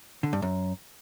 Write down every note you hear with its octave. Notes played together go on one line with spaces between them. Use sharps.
D3
G2
F#2